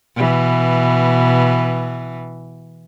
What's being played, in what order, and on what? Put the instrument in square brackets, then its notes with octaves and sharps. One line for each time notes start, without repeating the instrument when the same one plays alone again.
[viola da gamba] B2 E3